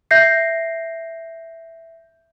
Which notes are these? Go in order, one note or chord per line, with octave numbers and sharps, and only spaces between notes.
E5 G6 A#6 C7